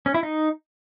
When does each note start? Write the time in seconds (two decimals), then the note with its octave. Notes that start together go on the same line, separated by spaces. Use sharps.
0.06 C#4
0.14 E4
0.23 D#4